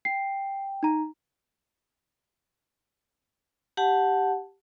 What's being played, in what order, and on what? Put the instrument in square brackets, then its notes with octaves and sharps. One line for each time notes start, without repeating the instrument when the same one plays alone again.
[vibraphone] G5 [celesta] C7
[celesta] D#4 A#5
[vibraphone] G4 F#5 A5